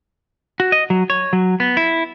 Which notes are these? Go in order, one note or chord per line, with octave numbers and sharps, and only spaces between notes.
F#4
D#5
F#3
C#5
F#3
B3
E4